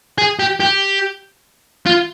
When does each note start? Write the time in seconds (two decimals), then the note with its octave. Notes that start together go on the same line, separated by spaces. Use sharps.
0.18 G#4
0.39 G4
0.60 G4
1.86 F4